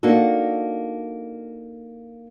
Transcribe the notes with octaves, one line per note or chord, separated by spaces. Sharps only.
A#3 D4 D#4 F#4 A4